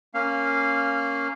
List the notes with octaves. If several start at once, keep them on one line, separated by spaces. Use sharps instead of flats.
A#3 C#4 F5